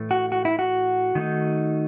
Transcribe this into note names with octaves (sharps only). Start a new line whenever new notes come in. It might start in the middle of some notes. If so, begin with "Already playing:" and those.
Already playing: A2 E3 A3
F#4
F#4
E4
F#4
D#3 A3 D#4